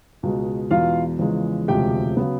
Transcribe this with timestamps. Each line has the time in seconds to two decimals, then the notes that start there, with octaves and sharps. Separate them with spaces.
0.23 C#2 B2 G#3
0.71 E2 B2 G#3 F4 F5
1.19 E2 C#3 F3 G#3
1.68 E1 D2 C3 F3 G#3 G4 G5
2.17 C#3 F#3 B3